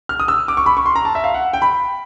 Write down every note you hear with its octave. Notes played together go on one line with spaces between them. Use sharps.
F6
D#6
E6
D6
C#6
B5
C#6
C6
A#5
A5
E5
F5
F#5
G5
B5